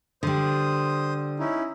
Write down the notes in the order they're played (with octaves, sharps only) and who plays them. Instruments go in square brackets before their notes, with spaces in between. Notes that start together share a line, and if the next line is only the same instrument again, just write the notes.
[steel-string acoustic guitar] D3 G3 [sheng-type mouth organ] C5 D#6
[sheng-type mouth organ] C#4 D#4 E4